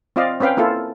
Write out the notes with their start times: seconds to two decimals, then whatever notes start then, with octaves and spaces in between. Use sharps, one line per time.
0.16 C4 F4 D5 D#5 F5
0.40 C4 C#4 B4 F5 G5
0.57 A#3 E4 F4 A4